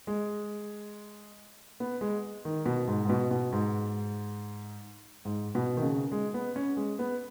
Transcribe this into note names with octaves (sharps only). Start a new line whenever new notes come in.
G#3
B3
G#3
D#3
B2
G#2
G#2
B2
B2
G#2
G#2
B2
D#3
C#3
G#3
B3
C#4
G#3
B3